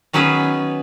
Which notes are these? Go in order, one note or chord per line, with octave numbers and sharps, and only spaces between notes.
D#3 F#3 B3 C#4 G#4 B4